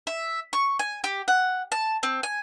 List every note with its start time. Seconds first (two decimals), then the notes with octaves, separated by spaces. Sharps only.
0.07 E5
0.53 C#6
0.79 G#5
1.04 G4
1.28 F#5
1.72 A5
2.03 C4
2.23 G#5